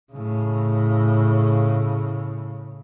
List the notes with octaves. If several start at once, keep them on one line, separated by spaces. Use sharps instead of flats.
A2 C#3